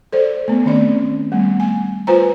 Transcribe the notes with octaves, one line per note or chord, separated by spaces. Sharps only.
A4 C5 D5
A3 B3
D#3 C4 C#4 D5
G3 A3 B3
G#5
F4 B4 C5 G#5 A#5